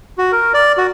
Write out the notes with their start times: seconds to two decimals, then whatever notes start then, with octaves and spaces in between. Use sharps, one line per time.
0.18 F#4
0.32 A#4
0.54 D5
0.78 F#4